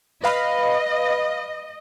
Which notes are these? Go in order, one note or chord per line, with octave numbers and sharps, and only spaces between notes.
B4 D#5 F5 B5